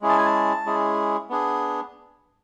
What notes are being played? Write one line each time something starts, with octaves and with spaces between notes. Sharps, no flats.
G#3 C#4 E4 G#4
A5
G#5
A5
G#3 C#4 E4 G#4
B3 D4 G#4